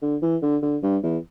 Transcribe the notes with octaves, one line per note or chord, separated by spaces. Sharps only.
D3
E3
D3
D3
G2
E2